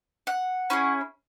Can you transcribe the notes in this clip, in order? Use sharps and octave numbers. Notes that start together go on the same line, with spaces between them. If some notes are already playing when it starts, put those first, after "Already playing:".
F#5
C#4 E4 G#4